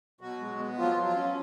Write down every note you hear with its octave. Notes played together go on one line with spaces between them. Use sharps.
B2 F#3 F#4
G#3
B3
F3 F#3 F4
F#3
F3 F4
C#4